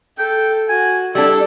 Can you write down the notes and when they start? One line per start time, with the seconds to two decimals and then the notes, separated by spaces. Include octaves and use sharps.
0.19 A4 G5
0.69 F#4 G#5
1.15 G3 D4 E4 A4